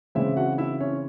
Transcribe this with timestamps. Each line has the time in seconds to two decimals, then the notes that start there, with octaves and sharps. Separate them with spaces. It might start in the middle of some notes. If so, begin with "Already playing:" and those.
0.15 C#3 E3 G#3 C4 E4 E5
0.37 F#4 F#5
0.58 E4 E5
0.81 C#4 C#5